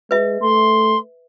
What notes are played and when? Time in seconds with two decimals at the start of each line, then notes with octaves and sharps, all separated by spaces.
0.11 G#3 B4 E5
0.41 A3 C6